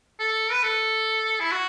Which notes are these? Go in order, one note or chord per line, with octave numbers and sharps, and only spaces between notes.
A4
B4
A4
E4
F#4